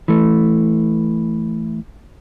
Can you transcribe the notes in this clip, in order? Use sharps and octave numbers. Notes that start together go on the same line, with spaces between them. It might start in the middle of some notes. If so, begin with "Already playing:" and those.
E3 A3